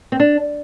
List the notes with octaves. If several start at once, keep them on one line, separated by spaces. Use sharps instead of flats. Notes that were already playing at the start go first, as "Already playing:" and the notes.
C4
D4